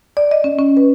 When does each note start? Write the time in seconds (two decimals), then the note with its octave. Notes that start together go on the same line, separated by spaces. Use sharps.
0.17 D5
0.31 D#5
0.44 C#4
0.59 C#4
0.77 B4